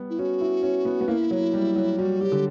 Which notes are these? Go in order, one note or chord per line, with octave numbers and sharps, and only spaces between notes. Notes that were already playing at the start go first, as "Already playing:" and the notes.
Already playing: G3 B3
E4
C#4 F#4
E4
C#4
B3
B3
A#3 E4
F#3
G3
F#3
G3 F#4
F#3 G4
D3